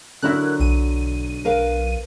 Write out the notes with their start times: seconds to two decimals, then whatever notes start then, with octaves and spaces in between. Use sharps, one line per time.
0.22 D3 F#3 E4 A#4 F#6
0.60 B1 D#7
1.45 A#4 B4 F5